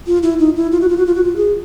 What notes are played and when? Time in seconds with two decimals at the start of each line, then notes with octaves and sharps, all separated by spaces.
0.07 F4
0.23 E4
0.39 D#4
0.56 E4
0.72 F4
0.81 F#4
0.89 F4
0.97 F#4
1.06 F4
1.15 F#4
1.24 F4
1.36 G#4